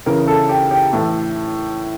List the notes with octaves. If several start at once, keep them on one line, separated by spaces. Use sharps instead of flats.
C#3 E3 A#4
A4
G4
G4
A2 E3 A4